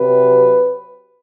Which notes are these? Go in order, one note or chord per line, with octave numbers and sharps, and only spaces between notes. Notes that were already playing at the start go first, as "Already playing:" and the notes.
Already playing: C3 F#3 B4